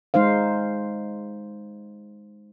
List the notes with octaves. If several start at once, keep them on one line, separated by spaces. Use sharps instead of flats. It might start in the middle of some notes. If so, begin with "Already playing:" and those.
G#3 D#4 C5 F5